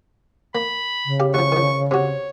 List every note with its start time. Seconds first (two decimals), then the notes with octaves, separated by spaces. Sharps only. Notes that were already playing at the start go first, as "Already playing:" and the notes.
0.55 A#3 B5
1.06 C#3
1.20 G4 F5
1.34 D2 F3 C#6
1.52 D#3 F3
1.91 C3 F#4 C#5